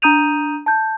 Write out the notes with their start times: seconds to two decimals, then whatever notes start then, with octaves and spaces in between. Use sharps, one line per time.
0.02 D4 A#5 D#6 G6 D#7 F7
0.66 A5 G6